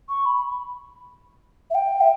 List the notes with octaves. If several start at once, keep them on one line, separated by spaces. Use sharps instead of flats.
C#6
B5
E5
G5
E5